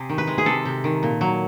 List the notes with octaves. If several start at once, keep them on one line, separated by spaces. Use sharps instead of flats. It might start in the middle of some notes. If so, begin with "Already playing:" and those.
Already playing: C3 G#4
D#3
B4
G#3
G#4
C3 A4
C3
D#3
A#2
F#3